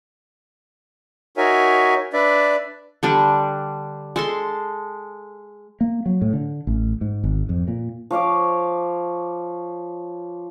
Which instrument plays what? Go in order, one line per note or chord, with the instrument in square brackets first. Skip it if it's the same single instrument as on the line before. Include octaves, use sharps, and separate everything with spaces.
[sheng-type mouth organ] D#4 F#4 A#4 C#5 E5 G#5
D4 B4 D5 E5
[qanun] D3 G3 D4
G#3 A4 C6
[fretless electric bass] A#3
F#3
A2
D3
A1
G#2
G#1
F2
A#2
[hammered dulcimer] F3 C#5 F5 D6